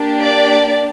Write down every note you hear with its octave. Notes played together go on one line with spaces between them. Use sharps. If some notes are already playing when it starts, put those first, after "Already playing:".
Already playing: A#3 D4 G4
D5